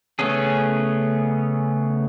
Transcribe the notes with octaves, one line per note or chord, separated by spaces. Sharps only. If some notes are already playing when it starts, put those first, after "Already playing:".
C#3 A3 B3 C#4 G#4